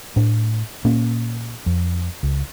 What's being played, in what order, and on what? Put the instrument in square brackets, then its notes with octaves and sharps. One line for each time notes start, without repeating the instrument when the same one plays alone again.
[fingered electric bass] A2 D4
A#2 A#3 C#4
F2
C#2